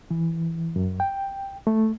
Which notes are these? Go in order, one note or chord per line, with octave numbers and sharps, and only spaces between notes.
E3
F#2
G5
A3